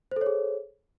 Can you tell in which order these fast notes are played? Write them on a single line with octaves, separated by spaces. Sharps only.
C5 A4 C#5 G#4